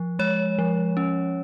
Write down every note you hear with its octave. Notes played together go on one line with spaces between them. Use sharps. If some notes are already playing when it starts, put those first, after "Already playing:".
Already playing: F3
G#3 C#5
F3
C#4